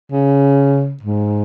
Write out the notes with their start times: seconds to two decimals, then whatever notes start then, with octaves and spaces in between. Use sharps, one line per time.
0.12 C#3
1.03 G#2